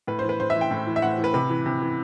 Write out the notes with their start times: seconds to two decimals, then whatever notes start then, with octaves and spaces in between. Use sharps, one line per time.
0.07 A2 B4
0.19 C5
0.24 E3
0.29 B4
0.40 A2 C5
0.50 E5
0.56 E3
0.61 G5
0.71 A2
0.87 E3
0.96 E5
1.02 A2 F#5
1.18 E3
1.24 B4
1.34 C3 B4
1.50 E3
1.66 C3
1.81 E3